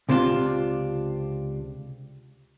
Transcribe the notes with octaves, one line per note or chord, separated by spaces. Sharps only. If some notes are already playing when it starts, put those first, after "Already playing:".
C#2 C3 C4 D4 F4